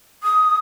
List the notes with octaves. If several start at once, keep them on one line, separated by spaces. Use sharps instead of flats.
D#6